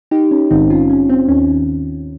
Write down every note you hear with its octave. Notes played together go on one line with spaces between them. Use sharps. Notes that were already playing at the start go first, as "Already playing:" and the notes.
D#4 G4
C#4
A#1 G#2 D#3 C4 D#4
C#4 F4
C#4
C4
D#2 D#3 C#4